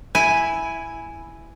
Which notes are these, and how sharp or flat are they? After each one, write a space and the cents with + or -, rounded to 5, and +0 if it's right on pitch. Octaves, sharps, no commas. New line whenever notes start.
E4 +0 G#5 +0